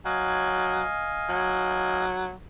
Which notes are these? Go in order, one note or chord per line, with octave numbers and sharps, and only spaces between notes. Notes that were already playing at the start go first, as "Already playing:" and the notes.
F#3 D#5 F5 G#5
F#3